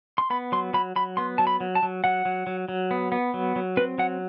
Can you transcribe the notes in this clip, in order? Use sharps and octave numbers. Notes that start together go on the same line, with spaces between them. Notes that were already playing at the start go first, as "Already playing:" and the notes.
C6
B3 B5
F#3 C6
F#3 B5
F#3 B5
B3 C6
F#3 A5
B5
F#3
A5
F#3
F#3 F#5
F#3
F#3
F#3
B3
B3
F#3
F#3
C4 B4
F#3 F#5